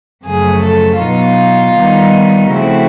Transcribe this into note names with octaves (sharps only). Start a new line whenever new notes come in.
F#2 C#3 F3 A3 G#4
A4
B2 F#3 B3 D#4 F4
D#3 G3 B3 D#4
C#3 F3 A3 C4 E4 F#4